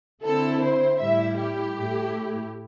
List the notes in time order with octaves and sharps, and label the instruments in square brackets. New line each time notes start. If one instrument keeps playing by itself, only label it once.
[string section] D3 C4 E4 A4
C5
A2 G3 E4 E5
G4
A2 A3 E4